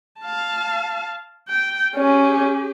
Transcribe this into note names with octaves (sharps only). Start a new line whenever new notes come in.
F5 A5
G5
C#4 G4 G#4